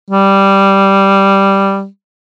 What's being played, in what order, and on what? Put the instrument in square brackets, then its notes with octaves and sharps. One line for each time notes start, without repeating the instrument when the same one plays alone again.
[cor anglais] G3